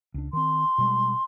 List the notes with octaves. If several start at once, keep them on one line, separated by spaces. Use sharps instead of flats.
C#2 D4
D#3 C4 C6
B2 G3 G#3